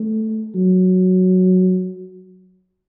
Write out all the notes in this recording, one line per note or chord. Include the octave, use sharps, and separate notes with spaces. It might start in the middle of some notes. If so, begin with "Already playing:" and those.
Already playing: A3
F#3